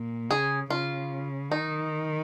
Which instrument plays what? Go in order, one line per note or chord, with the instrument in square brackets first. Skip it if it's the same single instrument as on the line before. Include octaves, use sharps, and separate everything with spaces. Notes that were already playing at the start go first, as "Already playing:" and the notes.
Already playing: [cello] A#2
[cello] C#3 [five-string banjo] G#4
[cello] C#3 [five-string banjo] F4
[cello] D#3 [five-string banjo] D#4